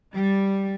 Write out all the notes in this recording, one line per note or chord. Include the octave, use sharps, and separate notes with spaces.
G3